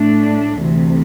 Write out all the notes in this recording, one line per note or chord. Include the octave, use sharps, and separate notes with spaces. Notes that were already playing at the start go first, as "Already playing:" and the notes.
Already playing: A2 A3 D4
D2 C3 E3